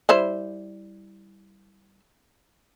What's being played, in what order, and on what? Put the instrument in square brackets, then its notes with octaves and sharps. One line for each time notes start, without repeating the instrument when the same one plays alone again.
[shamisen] G3 E4 C5